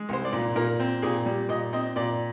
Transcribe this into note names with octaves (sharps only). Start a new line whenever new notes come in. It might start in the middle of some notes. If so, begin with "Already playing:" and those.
Already playing: G#3
C2 C5
D5
A#2
A#2 A#4
C4
A#2 G#4
G3
A#2 D#5
C4 D#5
A#2 D5